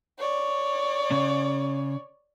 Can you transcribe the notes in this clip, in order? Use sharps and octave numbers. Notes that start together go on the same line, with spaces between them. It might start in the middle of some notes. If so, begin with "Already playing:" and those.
C#5 D5
C#3 C#4